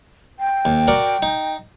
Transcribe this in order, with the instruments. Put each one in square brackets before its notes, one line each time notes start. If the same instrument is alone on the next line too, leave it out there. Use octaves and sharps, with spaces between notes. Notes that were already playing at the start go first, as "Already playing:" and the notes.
[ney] G5
[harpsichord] D#2
F#4 A#4 D5
D#4